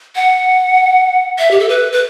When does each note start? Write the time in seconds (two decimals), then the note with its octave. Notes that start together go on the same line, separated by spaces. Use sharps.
0.16 F#5
1.39 E5
1.51 G4
1.60 A4
1.69 B4
1.92 B4